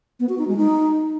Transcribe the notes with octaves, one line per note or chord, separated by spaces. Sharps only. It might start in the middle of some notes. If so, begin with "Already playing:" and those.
B3
F#4
D#4
G#3
D#4